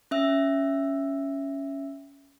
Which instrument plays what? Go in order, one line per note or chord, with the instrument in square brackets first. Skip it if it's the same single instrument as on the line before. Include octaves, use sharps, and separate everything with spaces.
[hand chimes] C#4 E5 E6